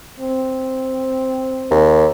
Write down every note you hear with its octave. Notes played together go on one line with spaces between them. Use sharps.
C4
D#2